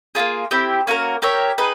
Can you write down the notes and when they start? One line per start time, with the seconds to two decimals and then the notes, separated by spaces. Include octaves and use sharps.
0.15 A#3 C#4 F4 G#4
0.51 C4 E4 G4
0.87 A#3 C#4 F#4 A#4
1.22 G4 A#4 C#5 E5
1.58 D#4 G#4 B4